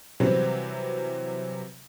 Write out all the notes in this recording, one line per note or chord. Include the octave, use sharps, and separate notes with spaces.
C3 E3 F#3 G3 C4